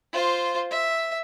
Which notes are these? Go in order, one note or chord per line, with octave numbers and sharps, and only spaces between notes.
F4 C5
E5